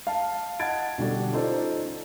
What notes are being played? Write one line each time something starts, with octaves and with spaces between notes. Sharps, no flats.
F5 A5
D#5 F#5 A5 G#6 A6 D7
B2 D3 G3 D4 F#4 A4
C#4 D#4 F4 A4 C5 D5